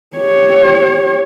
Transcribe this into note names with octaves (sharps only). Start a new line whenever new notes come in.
G4 C#5